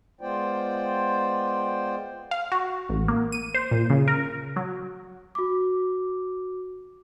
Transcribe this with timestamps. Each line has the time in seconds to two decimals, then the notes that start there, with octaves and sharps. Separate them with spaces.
0.21 G#3 B3 F4 C5 D5 G5
2.31 F5
2.52 F#4
2.89 A1
3.08 A#3
3.32 D#7
3.55 C5
3.71 A#2
3.90 C#3
4.08 A#4
4.56 F#3
5.35 F#4 D6